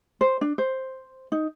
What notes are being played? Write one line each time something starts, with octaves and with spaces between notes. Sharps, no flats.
C5
D4
C5
D#4